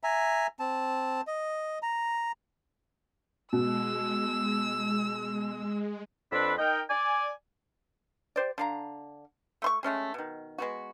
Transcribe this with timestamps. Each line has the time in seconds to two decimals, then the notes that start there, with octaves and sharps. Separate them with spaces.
0.04 E5 G#5 A#5
0.59 C4 A5
1.27 D#5
1.82 A#5
3.53 B2 G#3 E6
6.32 F2 D4 B4 C5 B5 E6
6.58 D#4 A#4 D#5 G5
6.90 D5 G#5
8.36 G4 C5 D5
8.58 D3 F5 A#5
9.62 A3 C6 C#6
9.83 G#3 A3 C#4 G#4
10.14 B2 D#3
10.58 G#3 B3 F#4